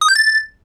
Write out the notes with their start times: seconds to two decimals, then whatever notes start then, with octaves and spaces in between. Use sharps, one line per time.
0.01 D#6
0.08 G6
0.15 A6